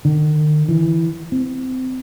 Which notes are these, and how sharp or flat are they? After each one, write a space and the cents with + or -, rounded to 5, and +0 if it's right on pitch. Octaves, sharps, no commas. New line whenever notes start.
D#3 -45
E3 +0
C4 -25